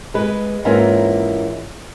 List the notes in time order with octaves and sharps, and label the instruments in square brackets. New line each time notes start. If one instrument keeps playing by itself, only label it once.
[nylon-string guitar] G#3 B4
G#2 E3 A#3 C4 C#4 F4